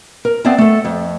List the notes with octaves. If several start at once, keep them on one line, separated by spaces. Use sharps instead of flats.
A#4
B3 C4 D5 E5 F5 A5
A3 A4
F2